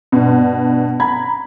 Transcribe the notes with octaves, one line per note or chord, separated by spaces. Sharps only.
G2 B2
A#5 B5 G#6